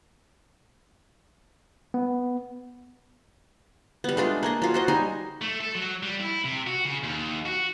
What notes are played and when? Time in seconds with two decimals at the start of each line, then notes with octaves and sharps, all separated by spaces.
1.94 B3
4.04 G3 B3
4.17 G#3 A3 D4 F4
4.43 A#3 G#4 D#5
4.62 F#3 F4
4.74 F#4 C5 D#5
4.88 G3 D#4 G#5
5.41 A3
5.61 A4
5.75 F#3
6.03 G3
6.20 E4
6.44 C3
6.67 F#4
6.85 C#3
7.03 D#2
7.46 F#4